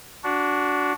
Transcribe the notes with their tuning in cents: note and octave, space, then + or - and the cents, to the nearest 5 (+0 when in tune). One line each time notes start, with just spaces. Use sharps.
D4 -15 F#4 +0